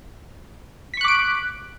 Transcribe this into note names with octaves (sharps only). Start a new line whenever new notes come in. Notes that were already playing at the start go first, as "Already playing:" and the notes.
C#6 D6 F#6 B6 D7